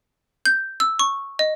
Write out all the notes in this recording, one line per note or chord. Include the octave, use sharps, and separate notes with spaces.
G6
E6
C#6
D#5